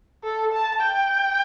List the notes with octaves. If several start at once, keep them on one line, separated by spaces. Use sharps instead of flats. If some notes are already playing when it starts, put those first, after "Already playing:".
A4
A5
G5